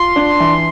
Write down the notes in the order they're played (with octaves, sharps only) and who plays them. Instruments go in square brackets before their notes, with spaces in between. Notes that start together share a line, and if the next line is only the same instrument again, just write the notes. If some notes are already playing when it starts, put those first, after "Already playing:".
Already playing: [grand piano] F4 [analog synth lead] C6
[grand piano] D4
E3